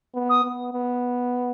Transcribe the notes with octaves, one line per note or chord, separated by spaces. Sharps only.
B3
D#6
B3
B3